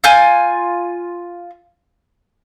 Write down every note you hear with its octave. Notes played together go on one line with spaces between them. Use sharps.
F4 G#5 G6